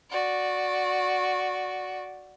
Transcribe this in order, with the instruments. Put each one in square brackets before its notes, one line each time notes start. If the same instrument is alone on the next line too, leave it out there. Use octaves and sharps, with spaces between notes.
[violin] F#4 D5